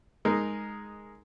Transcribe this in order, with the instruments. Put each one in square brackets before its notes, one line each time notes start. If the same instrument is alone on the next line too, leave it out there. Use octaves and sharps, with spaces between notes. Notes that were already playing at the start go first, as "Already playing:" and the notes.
[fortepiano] G#3 D#4 A#4